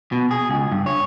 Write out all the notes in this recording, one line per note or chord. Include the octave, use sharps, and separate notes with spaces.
B2
G#4
C#2
G2
C#5